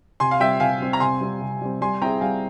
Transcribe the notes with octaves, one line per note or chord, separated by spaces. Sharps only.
C3 G#5 C6
F5
G3 C4 E5 G5
C3 F5 G#5
G3 C4
A#5
C3 G#5 C6
G3 C4
C3
G3 C4
G3 G#5 C6
C4 E4 G#4 G5 A#5
G3 F5 G#5